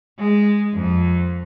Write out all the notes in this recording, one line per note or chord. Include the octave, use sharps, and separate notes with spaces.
G#3
F2